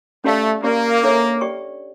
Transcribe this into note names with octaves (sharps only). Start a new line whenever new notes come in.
A3 C#4 G4 D5 F5
A#3 C#4 G4 D5
D4 A4 C#5 E5
G4 D5 G5 C#6